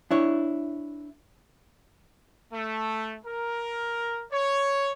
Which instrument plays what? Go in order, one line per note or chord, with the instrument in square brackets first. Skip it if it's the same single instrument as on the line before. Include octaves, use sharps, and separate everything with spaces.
[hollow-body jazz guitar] D4 E4 C#5
[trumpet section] A3
A#4
C#5